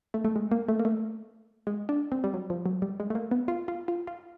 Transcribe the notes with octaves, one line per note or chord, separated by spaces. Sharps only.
A3
A3
G#3
A#3
A3
A#3
A3
G#3
D4
C4
G3
F#3
F3
F#3
G3
G#3
A3
A#3
B3
F4
F4
F4
F4